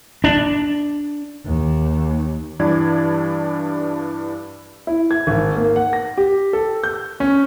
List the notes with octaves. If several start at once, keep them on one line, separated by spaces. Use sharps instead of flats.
D4
D#2
G2 E3 D4 D5 G#6
E4
G#6
G#1
A#3
F#5
A#6
G4
A4
G6
C#4